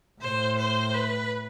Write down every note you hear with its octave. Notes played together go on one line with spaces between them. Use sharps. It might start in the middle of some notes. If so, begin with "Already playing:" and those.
A2 C5
C5
B4